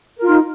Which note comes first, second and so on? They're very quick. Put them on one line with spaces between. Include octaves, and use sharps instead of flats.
A#4 F4 D#4